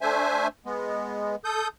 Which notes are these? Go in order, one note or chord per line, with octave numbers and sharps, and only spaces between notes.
A3 D4 C5 E5 G#5
G#3 B3
A4 D#6 G6